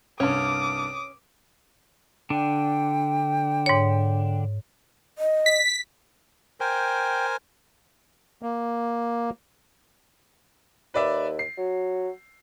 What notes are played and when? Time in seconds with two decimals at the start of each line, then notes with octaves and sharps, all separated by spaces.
0.20 C2 G2 C#4 D6 D#6
2.30 D3 D4 G5
3.66 G#2 C#5
5.18 D#5
5.46 B6
6.60 A#4 C5 G5 G#5
8.42 A#3
10.94 D#2 B4 D5 E5
11.39 C7
11.58 F#3